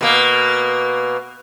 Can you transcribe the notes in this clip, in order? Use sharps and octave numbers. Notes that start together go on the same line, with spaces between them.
B2 A#3